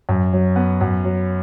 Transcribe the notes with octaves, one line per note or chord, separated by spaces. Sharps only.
F#2
F#3
B3
F#2
F#3